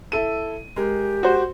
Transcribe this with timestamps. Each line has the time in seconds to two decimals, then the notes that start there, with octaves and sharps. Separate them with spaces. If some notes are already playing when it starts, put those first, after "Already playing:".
0.12 E4 A4 D#7
0.76 G#3 G4 A#4
1.23 F#4 C5